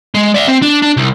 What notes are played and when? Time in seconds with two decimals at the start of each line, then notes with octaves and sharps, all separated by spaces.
0.14 G#3
0.34 D5 E5
0.48 C4
0.62 D4
0.82 D4
0.97 C2